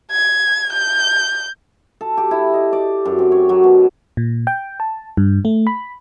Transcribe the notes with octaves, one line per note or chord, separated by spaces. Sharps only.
G#6
G6
A4
G4
E4
D#5
D5
F#2
C4
C#5
F#3
B2
A#2
G5
A5
G2
A3
B5